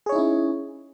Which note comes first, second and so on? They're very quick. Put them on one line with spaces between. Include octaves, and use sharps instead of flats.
G#4 C#5 D#4 E4 C#4